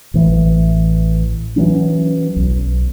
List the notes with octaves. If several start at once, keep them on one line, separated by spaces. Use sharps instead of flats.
A1 E3
E3 F#3 C#4
B1